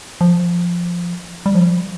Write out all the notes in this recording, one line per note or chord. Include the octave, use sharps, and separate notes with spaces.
F3
G3
F3